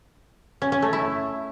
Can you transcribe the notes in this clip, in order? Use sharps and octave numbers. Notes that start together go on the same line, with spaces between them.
C#4
C#4
A3
E4